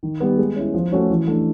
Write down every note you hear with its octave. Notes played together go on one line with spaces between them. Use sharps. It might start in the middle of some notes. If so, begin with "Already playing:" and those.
D#3
G3 B3
G#3
C#4 E4
F3
A3 C#4 F#4
E3
A3 D4